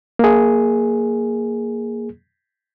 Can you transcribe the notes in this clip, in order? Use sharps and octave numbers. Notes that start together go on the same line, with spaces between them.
A#3 G#4